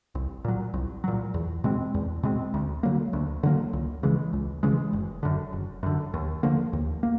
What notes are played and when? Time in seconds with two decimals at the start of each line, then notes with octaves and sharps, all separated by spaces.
0.15 C2
0.44 A#2 F#3
0.74 C2
1.04 A#2 F#3
1.34 E2
1.64 B2 G#3 C4
1.94 E2
2.23 B2 G#3 C4
2.54 D2
2.83 D3 F#3 A#3
3.13 D2
3.43 D3 F#3 A#3
3.73 C#2
4.03 C#3 E3 G#3
4.33 C#2
4.63 C#3 E3 G#3
4.93 F#1
5.23 F#2 D3
5.53 F#1
5.83 F#2 D3
6.14 D#2
6.43 D3 F3 A#3
6.73 D#2
7.03 A#3